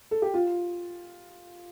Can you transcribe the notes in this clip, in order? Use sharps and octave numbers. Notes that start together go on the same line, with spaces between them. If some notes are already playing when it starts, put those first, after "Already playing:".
A4
G4
F4